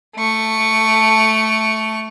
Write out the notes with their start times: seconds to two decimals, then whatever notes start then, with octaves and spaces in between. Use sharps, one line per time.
0.16 A3 C#6